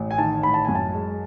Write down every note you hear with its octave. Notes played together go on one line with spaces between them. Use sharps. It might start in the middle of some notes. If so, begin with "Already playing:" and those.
Already playing: A1
G#5
D#3 A5
A1 B5
A5
F#2 G#5
A5
G#3